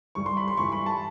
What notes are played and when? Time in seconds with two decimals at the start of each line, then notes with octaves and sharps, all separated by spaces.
0.15 G2 E3 G3 C#6
0.26 C6
0.37 B5
0.48 C6
0.57 G2 E3 G3 C#6
0.72 B5
0.86 A5